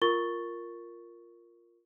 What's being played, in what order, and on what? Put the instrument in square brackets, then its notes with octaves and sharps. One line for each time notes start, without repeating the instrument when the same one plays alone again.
[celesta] F4 A#4 C#6 A6 G7